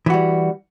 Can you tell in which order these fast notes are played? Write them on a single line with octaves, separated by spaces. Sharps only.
E3 F#4 G3